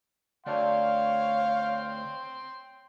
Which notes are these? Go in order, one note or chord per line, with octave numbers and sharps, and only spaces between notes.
D2 C#5 D5 F5 G5 A5 C6